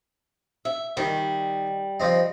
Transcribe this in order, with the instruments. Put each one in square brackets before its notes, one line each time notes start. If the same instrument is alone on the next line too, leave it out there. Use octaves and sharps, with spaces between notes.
[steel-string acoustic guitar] E5
[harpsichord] D#3 [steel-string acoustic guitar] G3
[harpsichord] F3 C4 D#4